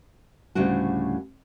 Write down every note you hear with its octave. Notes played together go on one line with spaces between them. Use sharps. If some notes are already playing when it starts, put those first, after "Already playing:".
D2 A2 C#3 G3 D4 F#4